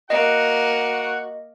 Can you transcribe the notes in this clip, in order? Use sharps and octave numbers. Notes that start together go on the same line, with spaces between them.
A#3 F#4 D#5 F#5